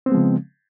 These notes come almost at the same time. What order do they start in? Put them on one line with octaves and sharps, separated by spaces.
C4 B3 G#3 F3 C#3